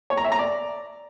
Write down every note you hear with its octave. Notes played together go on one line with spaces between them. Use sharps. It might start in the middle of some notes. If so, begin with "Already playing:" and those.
C#5
A#5
E5
A#5
D5